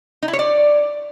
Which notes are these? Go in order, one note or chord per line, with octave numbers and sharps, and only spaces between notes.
D#4
E4
C#5
D5